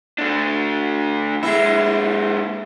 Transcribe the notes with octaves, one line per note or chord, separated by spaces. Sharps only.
A3 D4
A#2 G#3 E4